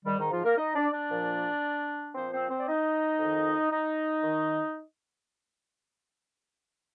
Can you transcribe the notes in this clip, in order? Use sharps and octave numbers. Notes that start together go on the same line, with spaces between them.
G#2 D#3 G3
D#3 D#4
F3 F4
A#3 A#4
D#4 D#5
D4 D5
D4 D5
A#2 F3
A#2 F3 C4 C5
C4 C5
C4 C5
D5
D#4 D#5
F2 D#3
D#4 D#5
D#3